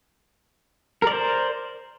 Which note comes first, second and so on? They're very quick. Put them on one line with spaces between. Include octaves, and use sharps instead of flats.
A#4 D5 C5